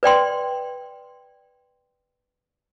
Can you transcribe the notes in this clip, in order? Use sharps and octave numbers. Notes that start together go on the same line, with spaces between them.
B4 D5 G5 C6